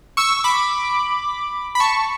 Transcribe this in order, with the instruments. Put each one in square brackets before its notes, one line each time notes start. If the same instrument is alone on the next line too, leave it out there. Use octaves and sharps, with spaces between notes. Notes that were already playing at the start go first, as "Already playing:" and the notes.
[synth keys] C#6 E6
B5 D6
B5
A5 C#6